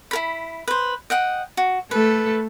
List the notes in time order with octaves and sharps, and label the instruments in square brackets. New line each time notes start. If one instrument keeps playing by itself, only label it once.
[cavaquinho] E4 A#4 B5
B4 C5
D#5 F#5 G5
F#4
[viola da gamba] A3 A4 [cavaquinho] B4